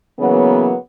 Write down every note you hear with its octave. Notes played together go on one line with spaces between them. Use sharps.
C#3 E3 F#3 A#3 B3